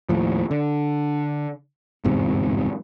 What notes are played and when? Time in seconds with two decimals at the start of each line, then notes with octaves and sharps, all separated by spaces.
0.09 D#2 A2 F3
0.51 D3
2.04 G1 E2 G#2 C3